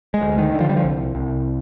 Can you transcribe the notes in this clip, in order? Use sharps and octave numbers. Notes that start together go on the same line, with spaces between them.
G#3
D2
D#3
D3
F3
G3
F3
C2
C2